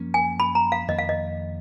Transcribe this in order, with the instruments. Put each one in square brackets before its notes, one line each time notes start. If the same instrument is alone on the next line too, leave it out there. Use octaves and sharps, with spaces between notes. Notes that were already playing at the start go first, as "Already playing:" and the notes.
Already playing: [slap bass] F#2 F3 A#3 C#4
[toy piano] G#5
B5
A#5
F5
[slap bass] F2 D#3 A#3 [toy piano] D#5
[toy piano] F5
D#5